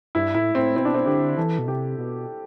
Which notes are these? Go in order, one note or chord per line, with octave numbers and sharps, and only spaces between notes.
G2 E4
A2 E4
A2 C4
B2 C4
D4
C4
D3 G4
E3 A4
B2
C3 G4
B2